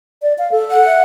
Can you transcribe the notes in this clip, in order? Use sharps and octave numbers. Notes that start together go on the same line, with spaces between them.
D5
F5
A4
F#5
E5